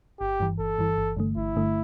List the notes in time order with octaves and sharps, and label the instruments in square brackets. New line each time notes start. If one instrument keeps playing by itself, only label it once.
[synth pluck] G1 [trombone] G4
[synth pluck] G2 E3
[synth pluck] G1 [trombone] A4
[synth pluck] G2 E3
G1
G2 D3 A3
[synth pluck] G1 [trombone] E4
[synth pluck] G2 D3 A3